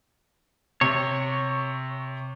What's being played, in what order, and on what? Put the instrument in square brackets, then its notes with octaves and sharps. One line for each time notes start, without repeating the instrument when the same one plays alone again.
[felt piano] C3 [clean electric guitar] C#5